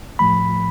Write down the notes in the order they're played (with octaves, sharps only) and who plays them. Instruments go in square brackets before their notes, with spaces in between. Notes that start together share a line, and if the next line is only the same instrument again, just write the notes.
[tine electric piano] A2 F3 A3 B5